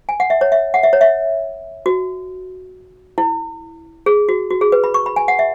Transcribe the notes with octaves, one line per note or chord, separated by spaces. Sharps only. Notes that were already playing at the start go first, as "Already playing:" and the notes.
G#5
F#5
E5
C#5
E5
F#5
E5
C#5
E5
F#4
E4
G#4
F#4
F#4
G#4
B4
B5
C#6
B5
G#5
F#5
E5